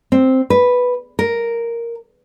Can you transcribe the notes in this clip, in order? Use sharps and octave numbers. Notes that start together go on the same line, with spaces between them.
C4
B4
A#4